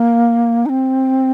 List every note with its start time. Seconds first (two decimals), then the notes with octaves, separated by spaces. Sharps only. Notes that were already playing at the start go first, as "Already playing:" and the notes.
Already playing: A#3
0.66 D#4
0.69 C4